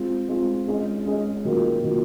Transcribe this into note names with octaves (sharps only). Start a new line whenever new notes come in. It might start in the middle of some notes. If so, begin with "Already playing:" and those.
Already playing: G#3 C4 F4
G#3 C4 F4
G#3 C#4 G#4 D#5
G#3 C#4 G#4 D#5
D#3 F#3 A#3 F4
D#3 F#3 A#3 F4